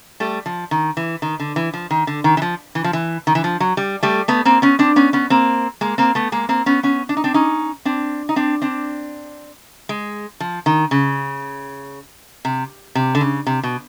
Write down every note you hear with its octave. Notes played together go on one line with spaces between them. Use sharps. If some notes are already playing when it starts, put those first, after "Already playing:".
G3 A3
F3
D#3
E3
D#3
D3
E3
F3
D#3
D3
D#3
E3
F3
E3
F3
E3
D#3
E3
F3
F#3
G3
G3 A3
A3 B3
A#3 C4
B3 C#4
C4 D4
B3 C#4
B3 C#4
A#3 C4
G#3 A#3
A#3 C4
A3 B3
G#3 A#3
A#3 C4
B3 C#4
B3 C#4
D4
D#4
C4 D4
C#4 D#4
C4 D4
D#4
C4 D4
C4 D4
G#3
F3
D#3
C#3
C3
C3
D3
C#3
C3
B2